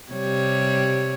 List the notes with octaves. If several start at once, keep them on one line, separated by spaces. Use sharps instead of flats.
C3 G3 C#5